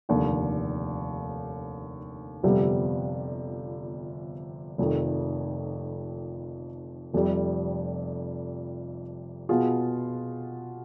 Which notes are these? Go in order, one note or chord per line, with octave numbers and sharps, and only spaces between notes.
F1 D#2 D3
G1 F2 C3 G3 B3
F1 F2 D#3
F1 F2 C3 G3
B2 B3 F4 G#4